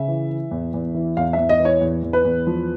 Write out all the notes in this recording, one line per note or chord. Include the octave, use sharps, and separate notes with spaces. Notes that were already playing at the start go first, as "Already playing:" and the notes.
Already playing: C#3 E5
E3
E3
E2
E2
E3
E2 F5
E2 E5
D#5
E3
C#5
E2
E2
B4
E2
F3